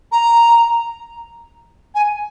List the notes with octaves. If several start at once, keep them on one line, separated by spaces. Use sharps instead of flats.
A#5
G#5